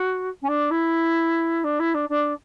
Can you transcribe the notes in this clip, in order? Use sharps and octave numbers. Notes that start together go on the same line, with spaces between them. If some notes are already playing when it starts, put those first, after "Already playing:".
Already playing: F#4
C#4
D4
E4
D4
E4
D4
D4